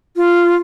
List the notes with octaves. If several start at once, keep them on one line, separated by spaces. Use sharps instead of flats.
F4